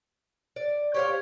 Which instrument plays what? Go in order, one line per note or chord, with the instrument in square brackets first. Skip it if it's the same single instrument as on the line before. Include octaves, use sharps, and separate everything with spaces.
[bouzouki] D5
[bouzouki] G4 C5 F5 [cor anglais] C#5